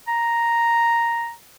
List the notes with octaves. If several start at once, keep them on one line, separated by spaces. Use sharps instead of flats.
A#5